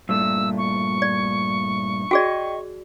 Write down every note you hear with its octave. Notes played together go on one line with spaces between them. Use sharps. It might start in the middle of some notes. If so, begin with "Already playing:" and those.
G2 A#2 A3 E6
C#6
D5
F#4 G#4 D5 D#5 G5